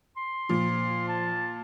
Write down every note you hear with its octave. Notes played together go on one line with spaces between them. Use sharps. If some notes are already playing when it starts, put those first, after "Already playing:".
C6
A#2 F3
A5